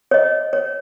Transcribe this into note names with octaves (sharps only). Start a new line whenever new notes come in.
C#5 D#5
C#5